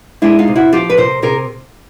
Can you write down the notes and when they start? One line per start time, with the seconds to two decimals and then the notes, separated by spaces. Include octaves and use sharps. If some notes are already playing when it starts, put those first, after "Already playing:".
0.22 G#3 D4 E4
0.39 D#4 F4
0.48 C3
0.56 E4 F#4
0.73 F3 F4 G4
0.90 B4
0.97 C3 A#4 C5
1.22 C3 G#4 A#4